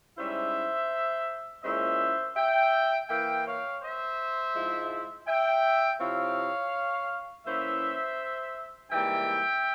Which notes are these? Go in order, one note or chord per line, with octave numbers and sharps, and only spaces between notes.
G#2 G3 C#4 E4 C5 E5
A#2 G#3 C#4 E4 C5 E5
E5 G5
E3 A#3 E4 E5 G5
C#5 F5
C5 E5
G#2 F3 G#3 E4
E5 G5
C3 F3 C4 E4 C#5 F5
E3 A#3 C#4 E4 C5 E5
G#2 E3 G3 A#3 E5 G5